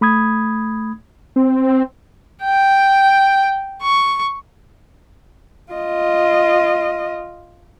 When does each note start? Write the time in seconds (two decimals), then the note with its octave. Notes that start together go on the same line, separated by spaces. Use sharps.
0.01 A3 B5 D#6 G#6
1.36 C4
2.44 G5
3.83 C#6
5.72 F4 D#5